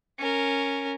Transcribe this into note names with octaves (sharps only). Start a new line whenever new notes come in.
C#4 A#4